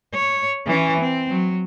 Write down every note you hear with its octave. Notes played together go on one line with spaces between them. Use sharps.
C#5
E3 C#4
C4
F#3